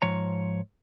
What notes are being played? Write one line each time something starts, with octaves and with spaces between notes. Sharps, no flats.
G#2 F3 C#5 A#5